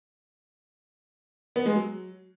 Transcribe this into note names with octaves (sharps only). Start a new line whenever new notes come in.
B3
G#3
F#3